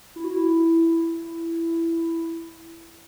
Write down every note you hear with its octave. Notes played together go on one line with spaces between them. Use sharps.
E4
F#4
E4